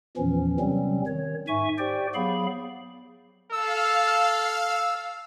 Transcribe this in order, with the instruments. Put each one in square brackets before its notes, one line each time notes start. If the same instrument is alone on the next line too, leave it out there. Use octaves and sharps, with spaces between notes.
[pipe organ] E2 A#2 E3 F3 C#4
C3 F#3 G3 C4 C#4
D#3 C#5
G#2 E5 G#5 C#6
G4 C5 D5 G5
F#3 B3 G#4 F5 B5
[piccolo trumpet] A4 [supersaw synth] F5 [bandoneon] E6